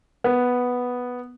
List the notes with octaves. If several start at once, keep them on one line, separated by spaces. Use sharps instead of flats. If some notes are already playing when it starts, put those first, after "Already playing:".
B3